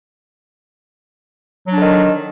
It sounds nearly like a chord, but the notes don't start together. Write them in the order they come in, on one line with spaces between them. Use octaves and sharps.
F#3 D4 D3 D#3